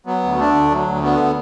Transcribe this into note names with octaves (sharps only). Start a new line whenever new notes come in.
F#3 B3
D2
D3 A3 D4
D2
F#3
D2
D3 B3